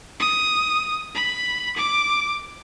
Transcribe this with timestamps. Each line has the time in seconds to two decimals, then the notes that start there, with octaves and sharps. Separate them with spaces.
0.20 D#6
1.15 B5
1.77 D6